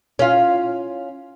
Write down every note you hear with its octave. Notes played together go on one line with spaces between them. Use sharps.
C#4 F4